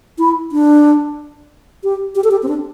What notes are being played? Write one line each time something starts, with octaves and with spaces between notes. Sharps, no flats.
E4
D4
G4
G4
A4
G4
C4
D4